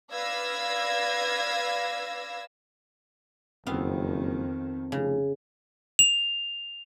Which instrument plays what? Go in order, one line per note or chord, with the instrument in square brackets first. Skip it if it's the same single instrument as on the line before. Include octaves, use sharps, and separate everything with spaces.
[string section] B4 D5 F5 E6 G#6 A#6
[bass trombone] F#1 [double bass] F2 D#3 [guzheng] B3 F5 [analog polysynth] C4
[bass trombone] F1 [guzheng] C#3
[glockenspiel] F7